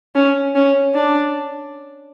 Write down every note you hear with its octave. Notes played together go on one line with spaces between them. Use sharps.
C#4
C#4
D4